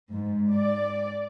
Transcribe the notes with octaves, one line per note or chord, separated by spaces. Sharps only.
G#2
D5